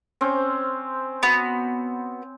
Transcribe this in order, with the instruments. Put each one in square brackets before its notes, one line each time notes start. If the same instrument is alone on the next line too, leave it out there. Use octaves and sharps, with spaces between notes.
[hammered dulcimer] C4 C#4 C5
[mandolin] B3 F#4